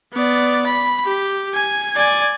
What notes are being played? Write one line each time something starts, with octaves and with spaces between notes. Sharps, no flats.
B3 D5
B5
G4
G#5
D5 G#5